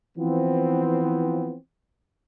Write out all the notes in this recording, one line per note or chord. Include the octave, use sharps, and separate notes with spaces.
E3 F3 B3 C4